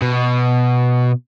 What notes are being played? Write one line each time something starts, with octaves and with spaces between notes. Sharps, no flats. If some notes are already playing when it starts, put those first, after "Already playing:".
B2